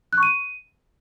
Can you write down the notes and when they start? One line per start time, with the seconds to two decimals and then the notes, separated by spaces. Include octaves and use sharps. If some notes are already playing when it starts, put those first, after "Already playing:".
0.13 F#6
0.18 C#6
0.23 D#7